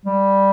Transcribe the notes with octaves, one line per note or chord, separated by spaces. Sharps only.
G3